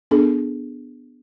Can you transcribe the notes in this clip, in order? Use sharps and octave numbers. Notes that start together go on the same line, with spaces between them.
B3 D4 G#4 A4